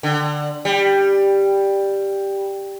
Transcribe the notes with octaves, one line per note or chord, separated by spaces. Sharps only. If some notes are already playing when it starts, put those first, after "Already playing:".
D3
G3